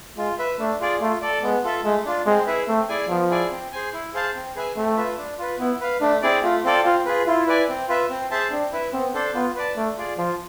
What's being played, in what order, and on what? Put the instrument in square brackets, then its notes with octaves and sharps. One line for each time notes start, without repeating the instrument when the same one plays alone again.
[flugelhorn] G#3 [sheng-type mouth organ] F4
[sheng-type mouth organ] B4 E5
[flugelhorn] A3 [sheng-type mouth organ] D4
[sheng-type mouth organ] F4 G#4 D5
[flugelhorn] A3 [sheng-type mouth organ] F4
[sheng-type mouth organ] A4 D5
[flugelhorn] G#3 [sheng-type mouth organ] B3
[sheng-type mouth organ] F4 A4 E5
[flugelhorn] G#3 [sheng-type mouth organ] A3
[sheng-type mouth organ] D4 F4
[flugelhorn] G#3 [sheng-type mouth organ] C4
[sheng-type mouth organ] E4 G#4 B4 E5
[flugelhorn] A3 [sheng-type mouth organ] C4
[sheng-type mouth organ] E4 G#4 D5 G#5
[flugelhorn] F3 [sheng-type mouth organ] B3
[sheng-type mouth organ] E4 G#4 D5 G#5
C4
G#4 C5 G#5
E4
G#4 C5 F5 A5
C4
G#4 B4 E5 G#5
[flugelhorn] A3 [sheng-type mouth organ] C4
[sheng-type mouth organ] F4 B4 E5
D4
F4 B4
[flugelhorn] B3 [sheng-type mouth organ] E4
[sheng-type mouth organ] B4 F5
[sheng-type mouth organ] A3 [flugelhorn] D4
[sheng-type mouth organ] C4 E4 G#4 D5
[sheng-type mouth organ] A3 [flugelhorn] F4
[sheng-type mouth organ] C4 F4 A4 D5
[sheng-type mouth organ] C4 [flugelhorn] F4
[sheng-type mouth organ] F4 G#4 B4
[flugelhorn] E4 [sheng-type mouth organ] F4
[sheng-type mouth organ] B4 D5 G#5
C4
F4 B4 E5
C4
G#4 C5 E5 A5
[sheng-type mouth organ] C4 [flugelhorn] D4
[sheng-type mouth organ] E4 B4 E5
[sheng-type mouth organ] B3 [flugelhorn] C4
[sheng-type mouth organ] D4 A4 C5
[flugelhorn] B3 [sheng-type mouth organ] F4
[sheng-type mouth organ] B4 D5 A5
[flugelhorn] A3 [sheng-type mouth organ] D4
[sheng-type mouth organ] F4 G#4 D5
[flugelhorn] F3 [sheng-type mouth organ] F4